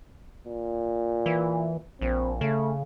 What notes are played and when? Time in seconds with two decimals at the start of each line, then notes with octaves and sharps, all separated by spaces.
0.45 A#2
1.26 E3
2.01 A#1 C4
2.41 C#3 A3